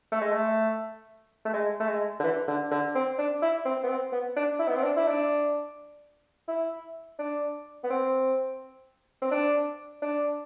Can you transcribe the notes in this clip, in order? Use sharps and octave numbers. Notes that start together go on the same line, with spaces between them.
A3
G#3
A3
A3
G#3
A3
G#3
D3
E3
D3
D3
C4
D4
E4
C4
B3
C4
B3
D4
E4
B3
C4
D4
E4
D4
E4
D4
B3
C4
C4
D4
D4